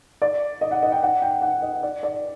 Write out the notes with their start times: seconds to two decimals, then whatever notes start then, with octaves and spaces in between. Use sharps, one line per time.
0.22 D5
0.61 D#5
0.71 F#5
0.83 D#5
0.92 G5
1.03 F#5
1.22 G5
1.42 F#5
1.62 D#5
1.83 D5
2.03 D5